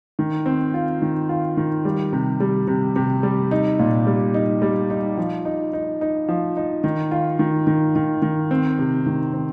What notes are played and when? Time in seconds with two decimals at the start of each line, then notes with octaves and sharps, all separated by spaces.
0.19 D#3
0.46 C4
0.74 F4
1.02 D#3
1.29 F4
1.57 D#3
1.85 G3
2.13 C3
2.40 G3
2.68 C3
2.96 C3
3.23 G3
3.51 D#4
3.79 A#2
4.07 G3
4.34 D#4
4.62 G3
4.90 D#4
5.18 F3
5.45 D#4
5.73 D#4
6.01 D#4
6.29 F3
6.57 D#4
6.84 D#3
7.11 F4
7.39 D#3
7.67 D#3
7.96 D#3
8.22 D#3
8.51 C4
8.79 C3
9.06 D#3
9.33 C4